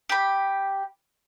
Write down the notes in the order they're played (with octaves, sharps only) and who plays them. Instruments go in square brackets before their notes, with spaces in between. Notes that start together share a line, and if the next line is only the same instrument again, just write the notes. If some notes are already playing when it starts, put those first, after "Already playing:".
[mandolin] G4 B5